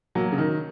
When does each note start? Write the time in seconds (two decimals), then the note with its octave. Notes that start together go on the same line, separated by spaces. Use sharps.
0.15 F#3 A#3
0.32 C#3
0.38 D#3